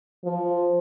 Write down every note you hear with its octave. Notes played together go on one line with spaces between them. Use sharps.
F3